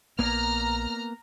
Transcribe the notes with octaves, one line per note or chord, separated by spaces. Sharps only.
A#1 A#3 B3 A#5 F6